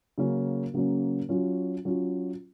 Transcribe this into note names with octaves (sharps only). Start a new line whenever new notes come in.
C#3 F#3 A#3 C#4
C#3 F#3 A#3 C#4
F#3 C#4 F4
F#3 C#4 F4